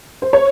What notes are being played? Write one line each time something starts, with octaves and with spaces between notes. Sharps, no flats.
C5
C#5